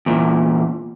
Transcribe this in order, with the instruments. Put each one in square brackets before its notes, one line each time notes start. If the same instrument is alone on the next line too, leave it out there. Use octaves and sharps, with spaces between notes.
[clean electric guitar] E2 A#2